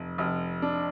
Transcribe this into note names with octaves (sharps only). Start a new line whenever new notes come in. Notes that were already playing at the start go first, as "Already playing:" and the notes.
Already playing: F1
F1
D4